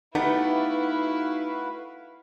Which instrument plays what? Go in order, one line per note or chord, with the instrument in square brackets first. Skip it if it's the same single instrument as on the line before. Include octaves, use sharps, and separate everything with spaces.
[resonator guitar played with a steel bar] A3 B3 G4 [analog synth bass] D#4 [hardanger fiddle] E4 [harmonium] F#4 B4 F5